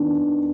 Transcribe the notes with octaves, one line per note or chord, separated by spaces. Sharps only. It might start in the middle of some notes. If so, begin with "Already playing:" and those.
Already playing: D#3 B3 D4